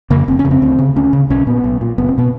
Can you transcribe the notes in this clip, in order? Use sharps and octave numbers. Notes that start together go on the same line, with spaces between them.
F2 C#3 A#3
F1 C4
C#4
F2 C#3
C4
D2
C#3
D2 C#4
C#3
B1 C#4
A#2 B3
B1
A#2
F#1 B3
C4
B2 B3